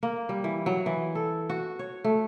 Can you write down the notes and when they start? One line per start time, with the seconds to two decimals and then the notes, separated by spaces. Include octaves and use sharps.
0.03 A#3
0.29 G3
0.44 E3
0.66 F#3
0.86 E3
1.15 A4
1.50 F#4
1.79 C#5
2.04 A3